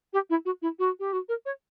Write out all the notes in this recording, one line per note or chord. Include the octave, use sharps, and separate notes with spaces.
G4
E4
F#4
E4
F#4
G4
F#4
A#4
C#5